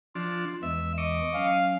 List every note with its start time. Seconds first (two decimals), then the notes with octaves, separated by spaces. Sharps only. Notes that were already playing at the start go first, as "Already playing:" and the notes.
0.15 F3 D4 F4
0.63 E2 E3 G#3 E5
0.98 D#5 C#6 D6
1.34 F#3 C#4 F5